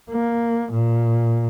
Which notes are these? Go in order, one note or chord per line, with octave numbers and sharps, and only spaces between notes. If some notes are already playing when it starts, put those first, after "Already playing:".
A#3
A#2